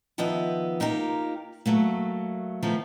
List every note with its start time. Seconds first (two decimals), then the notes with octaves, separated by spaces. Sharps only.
0.18 D#3 F3 B3 D#5 E5
0.80 A#3 D#4 F4 G4 A#4
1.66 F#3 A3 A#3
2.62 D#3 F3 A3 B3